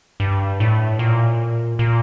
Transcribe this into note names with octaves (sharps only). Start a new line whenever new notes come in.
G2
A2
A#2
A#2